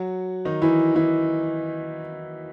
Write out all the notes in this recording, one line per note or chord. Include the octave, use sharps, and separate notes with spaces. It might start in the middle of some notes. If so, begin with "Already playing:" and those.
Already playing: F#3 F#4
D#3 D#4
E3 E4
E3 E4